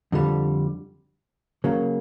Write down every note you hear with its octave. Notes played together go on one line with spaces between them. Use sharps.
F2 D3 G3
C#3 F#3 A#3